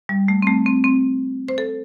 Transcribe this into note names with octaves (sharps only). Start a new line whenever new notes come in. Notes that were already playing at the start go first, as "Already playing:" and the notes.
G3
A3
C4
A3
C4
C4
C5
A4